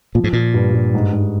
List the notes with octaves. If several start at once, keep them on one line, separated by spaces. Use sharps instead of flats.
A#2 F3
G#2
A#2 F3
G2
G2
G#2
G#2